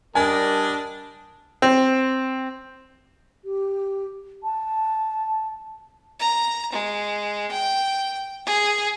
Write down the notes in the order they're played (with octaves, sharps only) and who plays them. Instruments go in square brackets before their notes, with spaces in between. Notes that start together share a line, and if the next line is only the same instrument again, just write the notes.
[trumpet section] G3 D#5 A5 [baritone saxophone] D4 [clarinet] A#4 [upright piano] G#5
[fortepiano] C4
[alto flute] G4
A5
[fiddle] A#5
G#3
G5
G#4